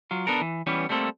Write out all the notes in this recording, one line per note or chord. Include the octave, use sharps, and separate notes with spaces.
F#3 F4
B3 D4 A4 A#4
E3
E3 G3 B3 C#4
G3 A3 A#3 C4 A4